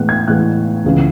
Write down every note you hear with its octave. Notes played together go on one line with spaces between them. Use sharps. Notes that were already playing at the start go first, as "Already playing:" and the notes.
Already playing: A2 E3 G#3 B3 F#6
G#6
A2 E3 G#3 B3 F#6
C#2 C#3 E3 B3